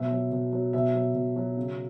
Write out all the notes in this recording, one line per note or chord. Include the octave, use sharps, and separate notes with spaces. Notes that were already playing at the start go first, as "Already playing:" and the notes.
Already playing: B2 F#3 E5
F#3
B2
F#3
B2 E5
F#3
B2
F#3
C#3